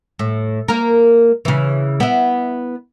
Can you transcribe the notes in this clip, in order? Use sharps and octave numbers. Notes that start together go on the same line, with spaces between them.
A2
A#3 A#4
C#3 E3
B3 E4